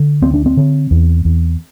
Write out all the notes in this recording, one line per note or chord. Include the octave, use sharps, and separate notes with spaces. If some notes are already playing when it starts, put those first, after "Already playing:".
Already playing: D3
D2 C4
D4
C4
D3
E2
E2